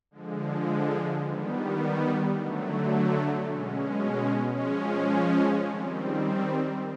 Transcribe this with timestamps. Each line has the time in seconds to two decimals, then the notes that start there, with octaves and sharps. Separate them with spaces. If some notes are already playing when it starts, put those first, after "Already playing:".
0.11 D3 F3 G#3
1.22 D#3 G3 B3
2.33 D3 F#3 A3
3.44 B2 G#3 C#4
4.55 F3 G#3 C#4
5.66 D#3 G3 C4